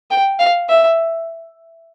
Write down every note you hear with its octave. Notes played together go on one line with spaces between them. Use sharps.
G5
F5
E5